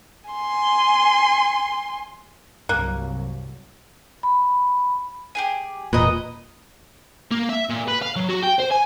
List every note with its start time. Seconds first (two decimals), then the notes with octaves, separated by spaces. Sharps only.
0.30 G#5 C6
2.69 C2 G2 F#3 A#3 F#6
4.23 B5
5.35 G4 G#4 G#5
5.93 E1 A#2 B4 D#5 A#5
7.31 A#3
7.49 E5
7.69 A#2
7.88 B4
8.02 F5
8.16 F#3
8.29 F#4
8.42 G5
8.59 C5
8.71 G#5